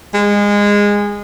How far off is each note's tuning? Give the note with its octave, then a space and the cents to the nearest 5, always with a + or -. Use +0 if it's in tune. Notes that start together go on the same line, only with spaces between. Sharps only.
G#3 -20